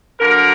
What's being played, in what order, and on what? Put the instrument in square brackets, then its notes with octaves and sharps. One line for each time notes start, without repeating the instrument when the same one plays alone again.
[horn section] D3 F#3 A#3 A#4